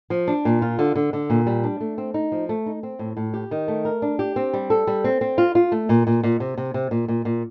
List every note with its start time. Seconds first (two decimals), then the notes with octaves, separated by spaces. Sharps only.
0.10 F3
0.28 D4
0.45 A#2
0.62 F4
0.79 D3
0.95 D3
1.13 D3
1.30 A#2
1.47 G3
1.63 D4
1.80 A3
1.98 C4
2.14 D#4
2.32 F3
2.49 A3
2.66 D#4
2.83 C4
2.99 A2
3.17 A2
3.34 G4
3.51 D#3
3.68 A3
3.85 A#4
4.02 D4
4.19 G4
4.36 C4
4.53 G3
4.70 A4
4.87 G3
5.04 C4
5.21 C4
5.38 F4
5.55 F4
5.72 A3
5.89 A#2
6.07 A#2
6.23 A#2
6.40 C3
6.58 C3
6.74 C3
6.91 A#2
7.08 A#2
7.25 A#2